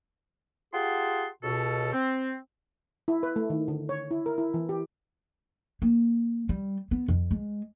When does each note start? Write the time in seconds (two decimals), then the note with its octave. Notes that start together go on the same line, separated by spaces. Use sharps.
0.73 F4 G4 G#4 F#5 A5 C6
1.43 C#2 B2 A4
1.93 C4
3.08 E4
3.23 B4
3.36 A3
3.50 D#3
3.68 D3
3.89 C#5
4.11 E4
4.26 A#4
4.38 E4
4.54 E3
4.69 G4
5.82 A#3
6.49 G3
6.91 B3
7.08 F2
7.31 G#3